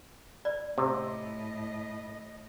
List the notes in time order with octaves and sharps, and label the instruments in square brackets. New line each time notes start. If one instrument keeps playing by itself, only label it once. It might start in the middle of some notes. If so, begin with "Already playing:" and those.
[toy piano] D5
[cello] A2 D#5 [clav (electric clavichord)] C3